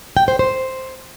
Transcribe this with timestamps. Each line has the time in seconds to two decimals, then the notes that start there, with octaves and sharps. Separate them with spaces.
0.17 G5
0.28 C5
0.39 C5